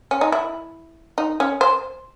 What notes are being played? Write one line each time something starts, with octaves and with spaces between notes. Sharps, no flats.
C#4
D#4
E4
D#4
C#4
C5